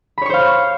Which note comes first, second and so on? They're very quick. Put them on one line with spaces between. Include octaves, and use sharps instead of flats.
B5 C#5 C#6 C5 F5